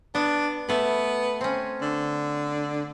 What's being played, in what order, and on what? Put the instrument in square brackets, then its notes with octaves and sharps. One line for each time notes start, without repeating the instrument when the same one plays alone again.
[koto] B3 [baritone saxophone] D4
[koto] A3 B4 [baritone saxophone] B3
[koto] C4 C#4
[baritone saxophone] D3